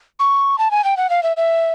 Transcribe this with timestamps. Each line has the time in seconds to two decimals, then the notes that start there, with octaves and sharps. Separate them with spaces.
0.19 C#6
0.58 A5
0.71 G#5
0.84 G5
0.97 F#5
1.10 F5
1.23 E5
1.37 E5